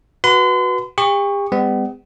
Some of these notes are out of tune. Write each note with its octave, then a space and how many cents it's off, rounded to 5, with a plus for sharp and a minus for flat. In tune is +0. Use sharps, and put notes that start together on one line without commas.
F#4 +0 B4 -10 C6 -40
G4 +40 C#6 +0
G3 +45 B3 +40